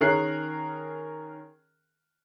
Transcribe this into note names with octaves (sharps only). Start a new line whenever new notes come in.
D#3 C#4 G#4 A#4 F#6 C7